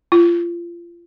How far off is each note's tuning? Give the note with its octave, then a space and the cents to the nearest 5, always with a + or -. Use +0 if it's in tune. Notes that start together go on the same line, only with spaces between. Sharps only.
F4 -30